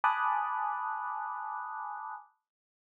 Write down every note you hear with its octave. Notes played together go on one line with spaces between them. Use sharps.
G#5 A5 B5 D6 D#6 F#6